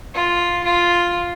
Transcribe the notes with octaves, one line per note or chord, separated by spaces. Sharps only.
F4
F4